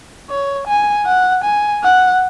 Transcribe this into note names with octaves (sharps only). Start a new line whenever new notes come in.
C#5
G#5
F#5
G#5
F#5